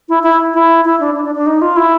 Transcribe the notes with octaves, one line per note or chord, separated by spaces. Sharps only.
E4
E4
E4
E4
D4
D4
D4
D4
D#4
F4
E4